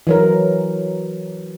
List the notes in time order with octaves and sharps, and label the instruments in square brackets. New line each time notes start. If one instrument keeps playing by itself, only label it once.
[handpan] E3 F#3 A#4